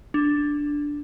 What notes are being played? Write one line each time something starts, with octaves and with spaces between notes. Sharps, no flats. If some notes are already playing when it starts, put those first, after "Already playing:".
D4